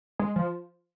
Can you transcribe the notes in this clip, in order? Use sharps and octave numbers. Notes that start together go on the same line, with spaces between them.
G#3
F3